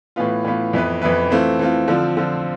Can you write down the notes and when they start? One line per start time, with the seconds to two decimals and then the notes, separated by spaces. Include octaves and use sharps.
0.16 A2 E3 B3 F4
0.45 A2 E3 B3 F4
0.73 F2 E3 B3 E4 B4
1.02 F2 E3 B3 E4 B4
1.31 E3 A3 C4 F4
1.59 E3 A3 C4 F4
1.88 D3 F3 C4 F4
2.17 D3 F3 C4 F4